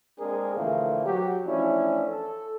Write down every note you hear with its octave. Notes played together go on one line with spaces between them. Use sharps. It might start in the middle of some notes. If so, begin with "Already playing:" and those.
G#3 A#3 C4 D4 G#4 A#4
A#2 D3 E3 F3 A3 A#3
F#3 F#4 G4
E3 F3 A3 C#4 D4 E4
A4